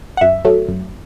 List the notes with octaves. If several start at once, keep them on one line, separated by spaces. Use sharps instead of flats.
F#5
F#2 E5
F#3 A3
F#2